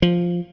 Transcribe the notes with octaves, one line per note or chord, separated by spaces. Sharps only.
F3